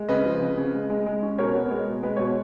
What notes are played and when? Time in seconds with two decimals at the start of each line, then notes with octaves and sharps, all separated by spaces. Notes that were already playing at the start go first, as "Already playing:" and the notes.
Already playing: G#3
0.09 C#3 B4 D#5
0.25 F3
0.41 C#3
0.57 C#3
0.74 G#3
0.90 G#3
1.06 G#3
1.23 C#4
1.38 B2 A#4 C#5
1.55 B3
1.71 G#3
1.87 B2
2.03 G#3 B4
2.16 B2 C#5